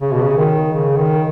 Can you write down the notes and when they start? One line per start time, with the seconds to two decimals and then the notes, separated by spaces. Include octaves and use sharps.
0.01 C#3
0.12 B2
0.24 C#3
0.37 D#3
0.74 C#3
0.97 D#3